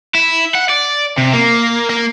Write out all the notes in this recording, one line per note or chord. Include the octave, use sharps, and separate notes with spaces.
E4
F#5
D5
C3
A#3
A#3